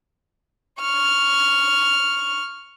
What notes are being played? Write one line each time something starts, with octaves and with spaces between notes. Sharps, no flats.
C#6 F6